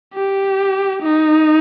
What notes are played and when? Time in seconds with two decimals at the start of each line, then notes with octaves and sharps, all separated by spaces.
0.14 G4
1.03 D#4